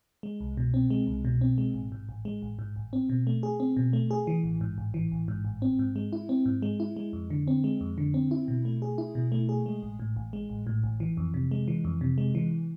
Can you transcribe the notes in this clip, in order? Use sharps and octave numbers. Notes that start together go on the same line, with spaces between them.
G#3
C2
B2
C4
G#3
C2
B2
C4
G#3
A1
G#2
A1
G#3
A1
G#2
A1
C4
B2
A3
G#4
C4
B2
A3
G#4
E3
A1
G#2
A1
E3
A1
G#2
A1
C4
G#2
G#3
E4
C4
G#2
G#3
E4
G#3
F2
D3
C4
G#3
F2
D3
C4
E4
B2
A3
G#4
E4
B2
A3
G#4
G#3
A1
A2
A1
G#3
A1
A2
A1
E3
F2
C3
G#3
E3
F2
C3
G#3
E3